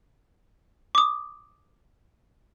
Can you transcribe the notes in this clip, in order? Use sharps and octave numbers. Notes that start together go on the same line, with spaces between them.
D6 D#6